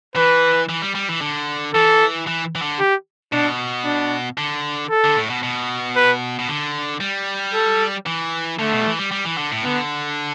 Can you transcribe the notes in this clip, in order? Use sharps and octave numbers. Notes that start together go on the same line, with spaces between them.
E3 B4
E3
G3
G3
E3
D3
E3 A4
E3
E3
D3
G4
B2 D4
D4
D3
A4
D3
A2
B2
B2
B4
B2
D3
G3
A4
E3
D3 A3
B2
G3
E3
G3
G3
E3
D3
A2
D3 B3